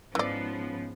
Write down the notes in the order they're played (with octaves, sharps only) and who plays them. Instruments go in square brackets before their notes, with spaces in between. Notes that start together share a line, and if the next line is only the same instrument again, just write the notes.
[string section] G#2 F3 B3 [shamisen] E3 D5 [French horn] C#4